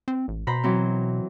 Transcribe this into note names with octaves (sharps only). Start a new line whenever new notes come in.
C4
A1
B2 C5 A#5 B5
E3 F#3 C4